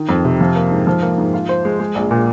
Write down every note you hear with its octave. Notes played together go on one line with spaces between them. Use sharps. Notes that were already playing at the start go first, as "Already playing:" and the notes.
Already playing: D#3
F2
C3
F3
A#3
G#2
F3
A#3
G#2
F4
C5
G#3
G#3
A#1
A#2